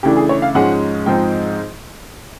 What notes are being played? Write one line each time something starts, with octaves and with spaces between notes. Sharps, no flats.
C#3 E3 A3 D4 G4
G#4
C#5
F5
G#2 F3 G#3 C#4 F#5
G#2 F3 G#3 C4 D#4 G5